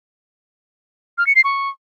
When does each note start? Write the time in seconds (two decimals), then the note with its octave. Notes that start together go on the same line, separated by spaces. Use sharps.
1.18 F6
1.27 C#7
1.35 C7
1.44 C#6